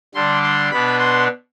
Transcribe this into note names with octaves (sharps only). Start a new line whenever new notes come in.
D3 G3 D4 C6
C6
B2 B3 D4 B5
C6